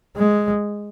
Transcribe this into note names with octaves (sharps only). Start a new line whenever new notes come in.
G#3